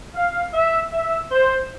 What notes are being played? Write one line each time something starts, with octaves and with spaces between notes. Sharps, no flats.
F5
E5
E5
C5